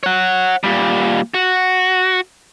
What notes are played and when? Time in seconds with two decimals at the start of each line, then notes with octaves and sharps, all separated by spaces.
0.03 C#5 F#5
0.64 A#2 G3
1.34 F#4